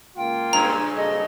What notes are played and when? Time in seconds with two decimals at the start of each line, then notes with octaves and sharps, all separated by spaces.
0.17 C#2 A#3 F4 G5
0.53 G2 A#2 C#3 A#5
0.96 F#1 G#4 A4 D#5